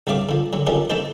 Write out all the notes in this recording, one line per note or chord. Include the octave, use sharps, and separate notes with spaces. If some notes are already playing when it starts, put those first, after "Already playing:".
C2 G2 A3 C#5 F5 D6
D3 F3
D3 F#3
D3 F3 C#4 D#4 G4 A#4
E3 A3 D#4 E4 B4 C5